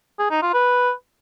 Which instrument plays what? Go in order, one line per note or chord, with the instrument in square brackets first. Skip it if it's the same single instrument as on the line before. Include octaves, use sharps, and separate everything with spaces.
[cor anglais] G#4
D#4
F4
B4